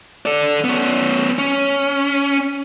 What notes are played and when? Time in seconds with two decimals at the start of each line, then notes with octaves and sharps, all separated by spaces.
0.26 A4 D5
0.64 B3 C#4
1.38 C#4